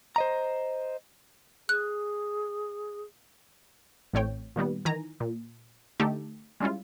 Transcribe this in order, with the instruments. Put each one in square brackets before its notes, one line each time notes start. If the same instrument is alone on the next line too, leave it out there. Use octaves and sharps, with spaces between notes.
[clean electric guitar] C5 D#5 A#5
[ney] G#4 [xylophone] F#6
[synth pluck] A1 A2 C4 C#5 G5
A#2 D#3 G3 B3
D#3 E3 G#5 A#5
A#2
D3 A3 D#4 G4 A4
G3 G#3 C#4 E4 F4